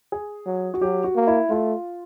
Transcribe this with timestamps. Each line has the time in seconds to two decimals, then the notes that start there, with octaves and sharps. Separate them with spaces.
0.12 G#4
0.46 F#3
0.74 F#4
0.81 F#3 G4
1.04 F#4
1.15 A#3
1.27 E4
1.50 A3 F4